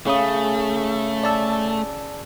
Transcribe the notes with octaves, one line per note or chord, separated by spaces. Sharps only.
C#3 A3 G#4 D#6
D5 A5 E6